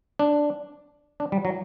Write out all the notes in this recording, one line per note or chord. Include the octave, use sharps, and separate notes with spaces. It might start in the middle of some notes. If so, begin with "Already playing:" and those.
D4
D4
G3
F#3